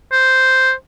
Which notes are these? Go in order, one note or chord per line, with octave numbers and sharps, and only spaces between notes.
C5